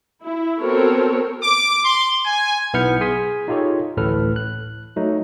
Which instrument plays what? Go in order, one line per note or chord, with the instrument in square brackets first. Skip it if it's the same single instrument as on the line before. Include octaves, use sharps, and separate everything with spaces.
[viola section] E4
B3 C4 F#4 A4 A#4 C#5
[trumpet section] D6
C6
G#5
[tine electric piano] B1 B3 E4 F6 G6 C#7
G#4 G#5 C6 B6
D#4 F4 G4 A4 C#5
A1 D2 A2 A4 B4 F6
F#6
F#3 A3 D#4